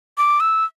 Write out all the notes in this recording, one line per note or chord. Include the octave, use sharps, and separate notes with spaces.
D6
E6